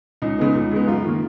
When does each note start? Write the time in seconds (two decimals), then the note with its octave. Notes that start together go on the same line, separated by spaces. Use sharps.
0.22 C#2 D#4
0.38 C#3 G#3 B3
0.55 C#2
0.71 C#3 G#3 B3
0.87 F#2 F4
1.04 D#3 A#3